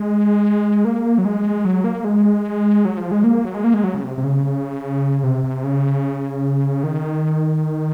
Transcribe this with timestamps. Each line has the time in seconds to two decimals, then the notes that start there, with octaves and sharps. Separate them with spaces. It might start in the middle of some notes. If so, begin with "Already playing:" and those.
Already playing: G#3
0.85 A#3
1.18 F#3
1.25 G#3
1.65 F#3
1.84 A#3
2.04 G#3
2.85 F#3
2.97 F3
3.11 G#3
3.24 A#3
3.45 F#3
3.54 G#3
3.64 A#3
3.74 G#3
3.84 F#3
3.94 C#3
4.04 C3
4.18 C3
4.24 C#3
5.23 C3
5.44 C3
5.64 C#3
6.84 D#3